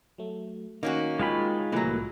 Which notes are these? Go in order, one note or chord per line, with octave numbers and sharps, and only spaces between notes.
F#3 A3
D#3 A#3 C#4 D#4 F#4
G#3 F4 C#5 G5 G#5 B5
C2 A2 E3 F#3 A3 A#3 A#5